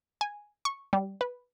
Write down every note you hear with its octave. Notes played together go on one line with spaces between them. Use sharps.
G#5
C#6
G3
B4